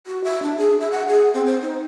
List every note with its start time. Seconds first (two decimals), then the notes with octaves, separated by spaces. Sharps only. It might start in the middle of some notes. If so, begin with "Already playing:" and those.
0.07 F#4
0.24 E5
0.43 D4
0.57 G#4
0.81 E5
0.92 F#5
1.08 G#4
1.34 C4
1.46 C5
1.62 D#4